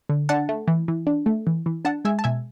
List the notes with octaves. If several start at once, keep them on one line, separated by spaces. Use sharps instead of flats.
D3
D4 F#5 A5
A3
E3
E3
D4
A3
E3
E3
D4 F#5 A5
G#3 E5 G#5
A5
B2 E5 G#5